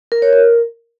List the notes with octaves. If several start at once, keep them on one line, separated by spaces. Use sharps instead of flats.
A#4
C#5
A#4